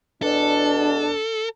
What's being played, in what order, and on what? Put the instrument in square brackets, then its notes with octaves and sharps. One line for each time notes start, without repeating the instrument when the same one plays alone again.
[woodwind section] E2 B2 [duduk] D4 [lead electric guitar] A4